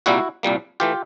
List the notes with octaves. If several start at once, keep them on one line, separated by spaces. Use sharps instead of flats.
C2 A#2 G3 A#3 E4 F#4
C2 A#2 G3 A#3
E3 A3 F4 G4